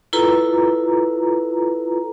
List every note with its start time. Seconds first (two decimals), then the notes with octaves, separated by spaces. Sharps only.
0.13 E4 F4 A4 B4 A#5